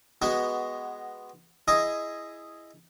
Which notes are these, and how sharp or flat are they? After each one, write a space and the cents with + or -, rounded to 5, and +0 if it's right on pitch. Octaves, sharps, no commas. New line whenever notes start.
G#3 +0 B3 +0 F#4 +15
E4 +10 G#4 +0 D#5 +0